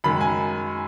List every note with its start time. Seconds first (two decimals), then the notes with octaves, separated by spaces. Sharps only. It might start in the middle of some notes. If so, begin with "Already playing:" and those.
0.04 F#2 D#3 G#3 B5
0.21 G#5